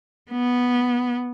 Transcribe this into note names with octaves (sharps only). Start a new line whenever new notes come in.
B3